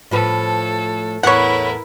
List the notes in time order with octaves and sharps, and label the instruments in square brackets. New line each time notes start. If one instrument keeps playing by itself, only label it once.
[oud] A2 F3 B4 [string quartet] A4
[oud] E2 A2 B3 [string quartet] E4 A#4 B4 [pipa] C#5 F#5